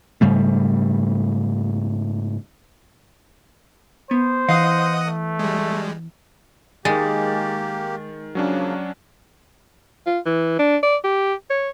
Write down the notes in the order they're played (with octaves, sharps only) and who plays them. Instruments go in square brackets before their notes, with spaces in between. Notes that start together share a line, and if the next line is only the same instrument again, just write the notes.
[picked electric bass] G#2 C#3 G3 A3
[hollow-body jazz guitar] B3 [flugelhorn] C5
[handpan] E3 [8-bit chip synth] D#5 F#5 D#6 [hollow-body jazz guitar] F5
[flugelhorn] A3
[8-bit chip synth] G3 G#3
[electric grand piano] D#3 A6 [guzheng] G#3 [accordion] A#3 G4
[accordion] C#3 F3 A#3 [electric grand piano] F#3 C#4 D4
[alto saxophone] F4
E3
D4
D5
G4
C#5